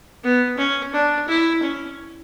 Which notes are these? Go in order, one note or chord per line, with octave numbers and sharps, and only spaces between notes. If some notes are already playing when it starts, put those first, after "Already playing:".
B3
C#4
D4
E4
C#4